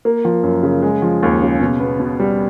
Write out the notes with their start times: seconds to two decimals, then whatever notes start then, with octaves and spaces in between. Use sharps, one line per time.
0.05 A#3
0.25 F3
0.43 F#2
0.63 C#3
0.82 G#3
1.02 F3
1.23 D#2
1.42 C#3
1.60 B2
1.80 B3
2.00 B2
2.20 G3